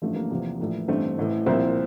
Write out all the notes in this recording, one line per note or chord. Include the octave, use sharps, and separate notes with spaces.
A1 G2 F3 A3
A#3
E2 C3 F3
A#1 A2 E3
A1 G2 D3 A3 C4
A1 A2 E3
C2 A#2 F3 C4 E4